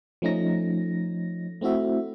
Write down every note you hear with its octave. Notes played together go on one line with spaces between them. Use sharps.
F3 A3 C#4 D#4 A#6
A3 C4 E4 F#4 E5